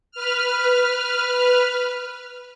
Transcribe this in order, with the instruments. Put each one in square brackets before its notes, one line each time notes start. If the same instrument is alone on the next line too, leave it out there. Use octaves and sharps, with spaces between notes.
[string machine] B4 F6